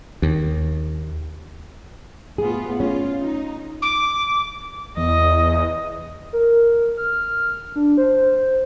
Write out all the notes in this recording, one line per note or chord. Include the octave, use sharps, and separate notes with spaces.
D#2
A2 B3 F4 G#4
C#4 F4
D#4
D6
E2 D#5
A#4
F6
D4
C5